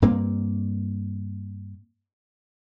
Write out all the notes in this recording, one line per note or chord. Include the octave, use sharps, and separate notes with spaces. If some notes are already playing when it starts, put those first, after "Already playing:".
G2 A#3 C4